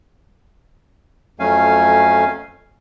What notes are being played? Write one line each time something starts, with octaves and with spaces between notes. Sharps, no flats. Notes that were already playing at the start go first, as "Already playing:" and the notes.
F2 F#3 A3 C#4 F5 G#5